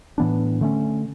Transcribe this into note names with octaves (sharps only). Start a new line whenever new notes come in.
A2 E3 B3 D4
D3 A3 C#4